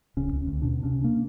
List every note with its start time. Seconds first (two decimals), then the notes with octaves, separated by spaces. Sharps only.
0.17 D1 C#3 C#4
0.33 C#2
0.46 D2
0.62 D#2 B2 D4
0.83 C3 C#4 D4
1.04 A#3